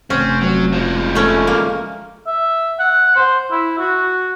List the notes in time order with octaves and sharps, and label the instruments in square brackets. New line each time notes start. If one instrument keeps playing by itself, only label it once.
[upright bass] F1 [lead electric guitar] C4 [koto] C#4
[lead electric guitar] F#3
F3 G#3
[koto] A3 C#4
A#3
[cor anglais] E5
F#5
C5
E4
F#4